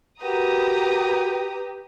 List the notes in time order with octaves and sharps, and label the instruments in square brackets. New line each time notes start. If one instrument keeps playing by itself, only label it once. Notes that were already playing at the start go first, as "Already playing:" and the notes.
[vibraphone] F#4 A#4 F#5 [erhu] G4 [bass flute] B4 [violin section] A#5 D#6